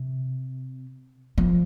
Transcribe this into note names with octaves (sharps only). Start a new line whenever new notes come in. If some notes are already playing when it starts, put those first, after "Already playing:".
Already playing: C3
F3